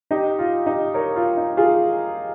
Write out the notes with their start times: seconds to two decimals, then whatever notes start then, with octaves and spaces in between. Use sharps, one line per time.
0.11 D#4 G4
0.39 F4
0.66 D#4 G4
0.94 A#4 C#5
1.16 F4
1.37 D#4
1.57 F4 G#4